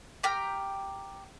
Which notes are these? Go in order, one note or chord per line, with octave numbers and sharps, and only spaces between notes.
G4 G5 A#5 F6